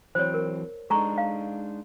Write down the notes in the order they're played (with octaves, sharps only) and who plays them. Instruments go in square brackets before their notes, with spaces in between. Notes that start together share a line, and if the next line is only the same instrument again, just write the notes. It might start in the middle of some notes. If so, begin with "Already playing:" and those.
[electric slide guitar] E3 F#3 C4 [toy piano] C5 C#5
[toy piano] A#4
[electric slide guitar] G#3 D4 D#4 [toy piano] A4 A#5 C#6
[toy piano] F5